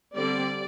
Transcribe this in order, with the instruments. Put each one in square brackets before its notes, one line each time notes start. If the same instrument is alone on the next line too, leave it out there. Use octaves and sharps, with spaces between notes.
[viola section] D3 G3 C4 D5